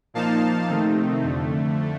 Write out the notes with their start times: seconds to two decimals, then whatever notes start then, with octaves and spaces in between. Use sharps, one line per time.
0.14 A#2 F3 A#3 D#4 F5 A5
0.69 C3 D#3 A3 C4 D#4
1.23 F2 D3 A3